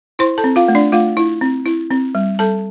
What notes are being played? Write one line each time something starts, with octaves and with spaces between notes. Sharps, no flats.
E4 C5 C6
A4 A5
C4
F4 F5
A3
D4 D5
A3 F4 F5
E4
C4
E4
C4
G3
G3 A4 A5